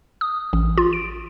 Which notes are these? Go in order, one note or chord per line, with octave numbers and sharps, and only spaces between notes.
D#6
A1
F4
D7